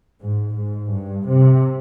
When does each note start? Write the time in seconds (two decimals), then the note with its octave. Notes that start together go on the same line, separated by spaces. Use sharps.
0.23 G#2
0.58 G#2
0.93 G2
1.29 C3